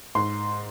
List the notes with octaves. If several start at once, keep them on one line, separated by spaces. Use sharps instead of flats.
G#2 C6